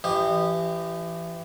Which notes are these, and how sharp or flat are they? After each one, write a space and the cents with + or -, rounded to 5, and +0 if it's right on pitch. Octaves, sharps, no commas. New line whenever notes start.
E3 +30 G4 -5 D#5 -25